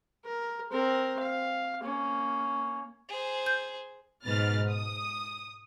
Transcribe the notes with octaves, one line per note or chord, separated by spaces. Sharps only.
A#4
C4 A#4
F5
A#3 C#4
G#4 C5
G6
G#2 B2 B4 F6 A6
D#6